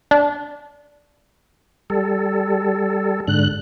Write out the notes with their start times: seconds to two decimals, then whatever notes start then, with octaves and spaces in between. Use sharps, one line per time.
0.11 D4
1.90 G3 A4
3.27 G#2 D3 F#6